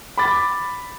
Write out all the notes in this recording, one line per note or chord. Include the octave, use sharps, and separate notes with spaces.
B5 D6 A6